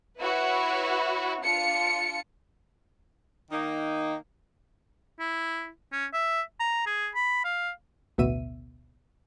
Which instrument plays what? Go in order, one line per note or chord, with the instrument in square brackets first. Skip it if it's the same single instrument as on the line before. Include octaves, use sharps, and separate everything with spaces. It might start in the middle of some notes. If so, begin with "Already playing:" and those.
[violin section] E4 F#4 B4 C#5
D4 F4 C#7
[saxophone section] D#3 A#3 D#4
[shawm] E4
C#4
E5
A#5
G#4
B5
F5
[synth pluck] A1 D2 B2 B3 E5 D#7